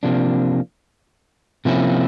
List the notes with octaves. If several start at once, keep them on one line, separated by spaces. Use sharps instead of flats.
C3 F3 A#3 D4
C3 F3 A#3 C#4 E4